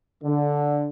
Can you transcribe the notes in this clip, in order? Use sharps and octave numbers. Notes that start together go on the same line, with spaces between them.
D3